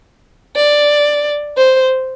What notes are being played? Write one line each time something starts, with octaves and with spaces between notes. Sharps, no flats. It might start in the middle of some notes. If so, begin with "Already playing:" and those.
D5
C5